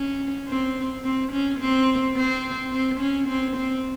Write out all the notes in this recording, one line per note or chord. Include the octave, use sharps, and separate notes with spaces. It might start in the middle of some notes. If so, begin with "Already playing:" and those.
Already playing: C#4
C4
C4
C#4
C4
C4
C4
C#4
C4
C4